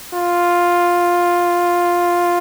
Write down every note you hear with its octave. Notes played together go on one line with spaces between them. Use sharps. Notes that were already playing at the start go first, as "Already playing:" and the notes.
F4